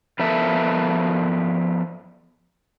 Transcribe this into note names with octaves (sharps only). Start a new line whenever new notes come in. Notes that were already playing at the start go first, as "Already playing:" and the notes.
F3 B3 A4 A#4 E5